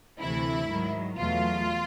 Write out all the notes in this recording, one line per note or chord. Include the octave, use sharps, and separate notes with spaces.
D2 C3 E3 A3 E4
G#2 D#3 F#3
E2 B2 F#3 A3 F4